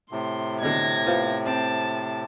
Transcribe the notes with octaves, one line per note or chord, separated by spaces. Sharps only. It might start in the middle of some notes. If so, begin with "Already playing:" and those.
A2 C3 C6
B2 D3 G#6 A#6
B3 F4 C5
C4 A5